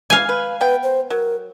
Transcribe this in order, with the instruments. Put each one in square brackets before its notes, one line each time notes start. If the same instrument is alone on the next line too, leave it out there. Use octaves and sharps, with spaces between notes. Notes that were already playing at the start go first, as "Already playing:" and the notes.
[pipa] E3 [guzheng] F5 G#5
[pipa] B4
[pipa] B3 G5 [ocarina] B4
[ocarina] C5
[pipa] F#3 [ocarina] A#4